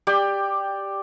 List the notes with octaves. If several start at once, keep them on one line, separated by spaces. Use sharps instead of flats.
G4 D5 G5